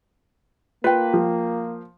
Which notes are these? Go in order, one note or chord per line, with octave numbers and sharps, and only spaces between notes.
A#3 F4 B4 G5
F3